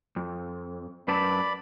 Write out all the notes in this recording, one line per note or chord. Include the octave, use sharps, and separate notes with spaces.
F2
F#2 B4 D5 A5 B5